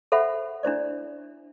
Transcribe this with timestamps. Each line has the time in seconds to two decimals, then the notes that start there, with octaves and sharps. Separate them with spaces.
0.12 A4 C5 E5 F#5 B5
0.63 D4 E4 C5 D5